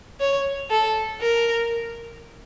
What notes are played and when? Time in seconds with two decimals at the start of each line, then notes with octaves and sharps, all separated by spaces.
0.20 C#5
0.71 A4
1.21 A#4